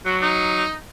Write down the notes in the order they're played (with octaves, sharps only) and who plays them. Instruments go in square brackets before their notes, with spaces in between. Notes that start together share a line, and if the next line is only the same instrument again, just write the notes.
[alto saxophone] F#3 [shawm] F#4
[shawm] D#4